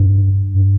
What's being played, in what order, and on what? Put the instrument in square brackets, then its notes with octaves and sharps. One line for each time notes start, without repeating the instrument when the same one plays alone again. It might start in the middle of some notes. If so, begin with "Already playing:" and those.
Already playing: [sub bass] G2